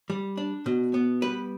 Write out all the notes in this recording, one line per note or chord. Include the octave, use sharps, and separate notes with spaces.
G3
D4
B2
B3
G3 B4